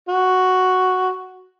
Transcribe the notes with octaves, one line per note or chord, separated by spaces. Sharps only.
F#4